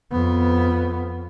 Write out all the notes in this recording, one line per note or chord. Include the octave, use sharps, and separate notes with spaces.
F2 B3